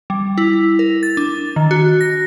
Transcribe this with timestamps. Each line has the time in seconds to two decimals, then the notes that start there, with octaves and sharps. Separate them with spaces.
0.10 G3
0.38 E4
0.79 A#4
1.03 A6
1.17 D4
1.56 D#3
1.71 F#4
2.01 A#6